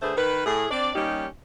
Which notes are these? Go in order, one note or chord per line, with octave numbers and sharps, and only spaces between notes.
D3 A3 G#4 B4 C5
D#3 A#4 B4
A2 G#4
C4 D4 D5
G3 A#3 C#4 D#4 G4